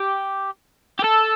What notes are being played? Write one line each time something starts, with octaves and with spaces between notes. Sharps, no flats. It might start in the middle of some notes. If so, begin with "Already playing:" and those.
Already playing: G4
G4
A4